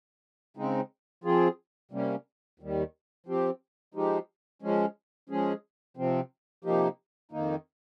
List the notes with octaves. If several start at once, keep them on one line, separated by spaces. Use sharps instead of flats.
C#3 G#3 C4 D#4
F3 C4 F4 G#4
C3 G3 A#3 C#4
D#2 D#3 G3
F3 C4 G4
F3 G#3 D#4 G4
F3 G#3 C#4
F3 G#3 C#4 G#4
C3 F3 C4
C3 F3 A#3 D#4 G4
F2 D#3 A#3 D#4